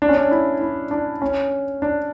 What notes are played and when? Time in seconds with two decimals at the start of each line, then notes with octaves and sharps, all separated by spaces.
0.02 D4
0.09 C#4
0.17 D4
0.31 E4
0.61 E4
0.91 D4
1.22 C#4
1.82 D4